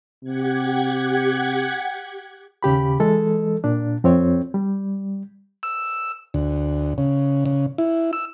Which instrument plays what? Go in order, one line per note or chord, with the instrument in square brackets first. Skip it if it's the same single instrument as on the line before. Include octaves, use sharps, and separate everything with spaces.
[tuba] C3 [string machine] G4 F#5 G#6
[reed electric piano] D#2 C#3 G4 B5
E3 G#3 A4
A#2 D4
F2 C4 C#5
G3
[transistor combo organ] E6
D2
C#3
C#3
E4
E6